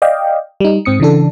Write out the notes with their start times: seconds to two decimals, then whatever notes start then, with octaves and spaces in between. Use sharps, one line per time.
0.02 D5 D#5 F5 G5
0.60 G3 D#4
0.85 G#2 C4 D#6 C#7
1.00 C#3 E3 D4 A4